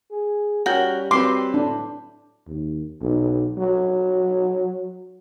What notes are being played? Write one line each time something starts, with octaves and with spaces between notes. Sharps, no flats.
G#4
G3 C#4 F#4 A#4 G6
F#3 C4 B4 C6 D6
A2 D4
D#2
B1
F#3